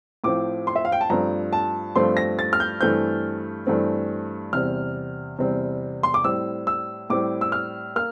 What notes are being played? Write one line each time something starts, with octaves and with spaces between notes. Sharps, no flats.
A2 F3 C4 D6
C6
E5
F5
G5
A5
G2 F3 A3 C4 A#5
A5
G2 F3 A3 C4 C6
A#6
A6
F6
G6
G2 E3 A3 C4 G6
G2 E3 A3 C4
E2 C3 G3 C4 F6
E2 C3 G3 C4
C6
D6
A2 G3 C4 E6
E6
A2 G3 C4 D6
E6
F6
A#3 F6